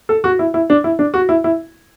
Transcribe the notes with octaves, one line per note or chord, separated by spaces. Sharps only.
A4
F#4
E4
E4
D4
E4
D4
F#4
E4
E4